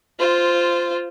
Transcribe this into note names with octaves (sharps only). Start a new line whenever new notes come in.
F4 C5